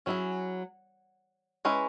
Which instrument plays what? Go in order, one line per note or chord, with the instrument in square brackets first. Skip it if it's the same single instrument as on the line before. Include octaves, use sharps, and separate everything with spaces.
[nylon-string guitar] F#3 [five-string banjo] C#4 E4 G#4
[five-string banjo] G#3 C#4 E4 B4